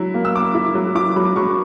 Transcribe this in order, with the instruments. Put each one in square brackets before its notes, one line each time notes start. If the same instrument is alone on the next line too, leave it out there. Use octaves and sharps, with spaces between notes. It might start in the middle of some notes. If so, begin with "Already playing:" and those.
Already playing: [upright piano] F#3 E4
A#3
E6
A#3 D6
E4
F#3
E4 D6
F#3 B5
F#3 C#6